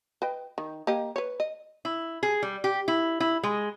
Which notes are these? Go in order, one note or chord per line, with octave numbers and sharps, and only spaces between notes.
B4 D#5 G5
D#3
A#3 G4 D#5
B4 C#5
D#5
E4
G#4
G3
G4
E4
E4
G#3